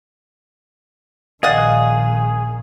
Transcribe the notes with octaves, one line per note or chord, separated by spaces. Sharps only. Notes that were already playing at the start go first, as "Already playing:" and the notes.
A#1 D#3 G#4 D5 D#5 F5 F#5